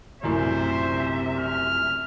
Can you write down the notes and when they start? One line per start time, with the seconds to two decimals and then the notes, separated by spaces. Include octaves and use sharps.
0.23 A#1 F#2 A2 C3 C5 E5
1.38 F6